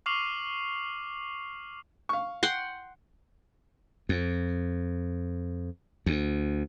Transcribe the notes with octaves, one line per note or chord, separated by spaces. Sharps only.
C#6 D6 F6 C7 F7 F#7
F5 C#6
F#5 G5 C6
F2
D2